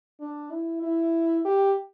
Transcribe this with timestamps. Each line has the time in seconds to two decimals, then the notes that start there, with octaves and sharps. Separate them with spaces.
0.20 D4
0.51 E4
0.83 E4
1.45 G4